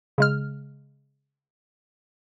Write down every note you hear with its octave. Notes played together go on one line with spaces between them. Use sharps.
C#3 G#3 F6